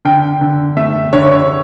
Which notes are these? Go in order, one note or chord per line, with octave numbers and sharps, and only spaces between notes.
D3 G5
D3
A3 E5
D3 C#5
C#5